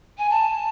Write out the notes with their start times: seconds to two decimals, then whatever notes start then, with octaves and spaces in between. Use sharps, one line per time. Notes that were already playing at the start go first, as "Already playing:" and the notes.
0.17 G#5
0.29 A5